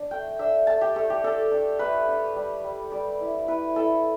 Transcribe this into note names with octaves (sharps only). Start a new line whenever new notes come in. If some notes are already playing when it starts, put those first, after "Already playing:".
Already playing: D4
A3 G5
D4 E5
A3 A5
G4
A3 A4
G4
D4 A4
D4
A3 B4
D4
G3
G3
G3 D5
E4
E4 B4
E4 A4